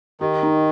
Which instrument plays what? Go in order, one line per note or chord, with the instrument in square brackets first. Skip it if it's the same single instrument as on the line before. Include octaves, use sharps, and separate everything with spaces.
[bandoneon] D#3 [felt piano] G4
[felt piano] D#4